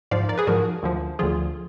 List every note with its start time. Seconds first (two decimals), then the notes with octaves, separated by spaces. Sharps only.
0.11 G#2 F3 D5 F5
0.29 A#4 D5
0.38 G#4 B4
0.47 G#2 F3 F#4 A#4
0.83 D2 D3 F3
1.19 D2 D3 F3 F4 G#4